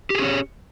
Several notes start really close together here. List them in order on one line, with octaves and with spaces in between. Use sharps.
G4 G#4 C#4 C#5